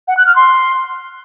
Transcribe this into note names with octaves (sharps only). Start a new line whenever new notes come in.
F#5
F#6
F6
C6